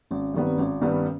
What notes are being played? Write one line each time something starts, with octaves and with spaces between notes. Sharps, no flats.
G#1 C#4
G2 D#3 G3 B3
C4
G#1 C#4
G2 D#3 G3 B3 C#4